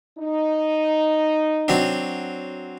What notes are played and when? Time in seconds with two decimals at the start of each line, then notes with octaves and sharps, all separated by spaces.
0.18 D#4
1.68 F#3 C4 D4